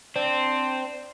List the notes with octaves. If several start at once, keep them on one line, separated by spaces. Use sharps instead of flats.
C4 D4